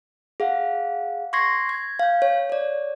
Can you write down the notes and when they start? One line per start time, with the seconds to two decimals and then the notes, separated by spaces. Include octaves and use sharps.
0.40 G#4 F5 F#5
1.33 C6 C#6 G#6 A#6 C7
1.69 G#6
2.00 F5 G6
2.22 C#5
2.50 C#5 D5